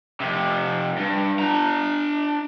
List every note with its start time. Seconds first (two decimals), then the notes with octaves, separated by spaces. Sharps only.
0.21 F2 C3
0.97 G2
1.39 D4 A#5